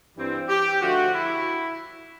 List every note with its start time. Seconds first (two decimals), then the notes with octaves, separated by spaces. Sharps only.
0.16 G2 E3 G3 C4
0.48 G4
0.81 D3 F3 A3 F#4
1.14 E4